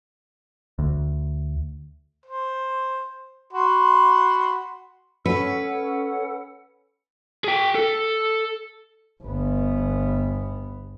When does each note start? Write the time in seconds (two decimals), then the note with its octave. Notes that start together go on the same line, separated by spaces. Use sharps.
0.79 D2
2.25 C5
3.53 F#4 B5 C6
5.26 C#4 A4 B4 F#5
7.44 G#4 G5
7.75 A4
9.23 G1 B3